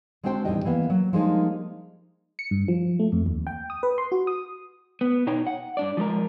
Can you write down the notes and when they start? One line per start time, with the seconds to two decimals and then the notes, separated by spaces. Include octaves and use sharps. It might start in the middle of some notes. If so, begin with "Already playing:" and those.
0.24 G#3 C4 D4 F#4 C5 G5
0.45 E2 A2 D#3 G3 D#5 G5
0.65 E3 A#3 B3
0.90 F#3
1.13 F3 G3 G#3 A#3 D4 D#4
2.39 C#7
2.51 G2
2.68 F3
2.99 A3
3.12 F2
3.26 D#2
3.47 G5
3.70 D#6
3.83 B4
3.98 C6
4.12 F#4
4.27 D#6
5.01 B3
5.27 B2 D#4 C#5 G5
5.47 F#5
5.77 G2 D4 D5
5.97 F3 G#3 A4 A#4